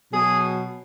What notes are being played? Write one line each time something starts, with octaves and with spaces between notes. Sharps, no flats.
B2 F#3 G#4